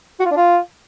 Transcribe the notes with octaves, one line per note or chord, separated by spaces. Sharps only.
F#4
F4
D4
F4